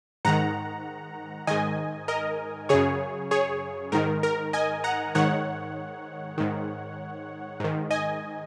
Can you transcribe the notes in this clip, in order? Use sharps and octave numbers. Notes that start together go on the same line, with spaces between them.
G#2 D#3 F#5 A#5
G#2 D#3 D#5 G#5
A#4 D#5
F#2 C#3 G#4 C#5
G#4 C#5
G#2 D#3 A#4
A#4
D#5 G#5
F#5 A#5
G#2 D#3 C#5 F#5
G#2 D#3
G#2 D#3
D#5 G#5